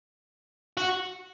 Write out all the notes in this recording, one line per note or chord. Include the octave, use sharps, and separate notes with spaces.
F#4